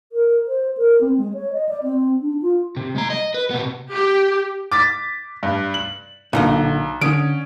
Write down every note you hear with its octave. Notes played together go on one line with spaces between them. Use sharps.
A#4
C5
A#4
C4
G#3
C#5
D#5
D5
C4
D4
F4
C3
G#3 A#5
D#5
B4
C3 B3
G4
D6 A6 B6
G2
F#7
B1 A#2 D3 D#5
D3 C#4 D#6 D7